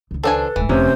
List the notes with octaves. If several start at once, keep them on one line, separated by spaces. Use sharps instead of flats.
C#2 D#3
F3 D4 A4 B4 G#5
D1 G#2 E3
F1 C3 C#4 C5